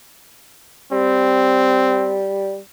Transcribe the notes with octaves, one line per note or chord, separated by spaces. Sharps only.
G3 C4